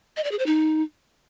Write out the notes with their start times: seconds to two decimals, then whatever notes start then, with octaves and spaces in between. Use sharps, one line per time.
0.17 D#5
0.24 D5
0.31 G#4
0.39 C5
0.46 D#4